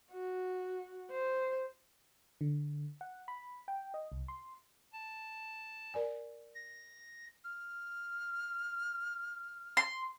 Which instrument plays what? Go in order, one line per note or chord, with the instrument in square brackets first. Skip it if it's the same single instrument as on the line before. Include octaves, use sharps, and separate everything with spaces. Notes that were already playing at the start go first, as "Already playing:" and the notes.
[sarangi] F#4
C5
[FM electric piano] D3
F#5
B5
G5
D#5
C2
C6
[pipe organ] A5
[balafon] A#4 D5 G#5
[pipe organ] A#6
[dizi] F6
[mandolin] C6